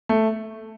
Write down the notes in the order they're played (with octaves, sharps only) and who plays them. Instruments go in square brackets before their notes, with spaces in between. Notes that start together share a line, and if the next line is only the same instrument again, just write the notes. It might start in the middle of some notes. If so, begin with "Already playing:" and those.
[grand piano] A3